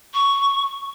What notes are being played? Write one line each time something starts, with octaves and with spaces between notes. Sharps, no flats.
C#6